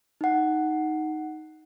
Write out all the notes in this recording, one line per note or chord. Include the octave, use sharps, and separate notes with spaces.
D#4 F#5